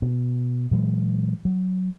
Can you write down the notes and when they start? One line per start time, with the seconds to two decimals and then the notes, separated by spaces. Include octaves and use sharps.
0.02 B2
0.71 A#2 E3 F#3 G#3
1.45 F#3